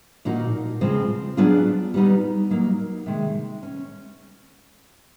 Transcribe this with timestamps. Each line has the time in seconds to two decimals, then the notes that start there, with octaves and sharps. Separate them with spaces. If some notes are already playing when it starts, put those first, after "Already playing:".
0.25 A#2 F3 A#3 D#4 F#4
0.81 C#3 F3 G#3 C4
1.37 F#3 B3 D4 F4 G#4
1.94 G3 B3 D#4
2.50 F#3 A#3 D#4
3.06 C3 D#3 G#3
3.63 C#4